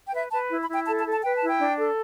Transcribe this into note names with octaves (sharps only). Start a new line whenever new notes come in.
G5
B4 E5
B4 A5
E4
B5
E4
G5
A4 A5
A5
A4
A5
B4 G5
A5
E4 G5
D4
A4